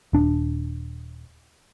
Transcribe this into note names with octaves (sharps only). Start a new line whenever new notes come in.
D#1 D4